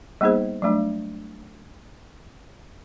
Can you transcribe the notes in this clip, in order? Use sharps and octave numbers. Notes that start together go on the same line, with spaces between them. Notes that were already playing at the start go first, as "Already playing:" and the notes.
G3 A#3 B3 D#4 G#4 C5
F#3 G3 A3 D4